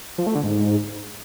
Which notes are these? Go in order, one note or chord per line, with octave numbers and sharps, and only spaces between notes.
F3
A3
D3
G#2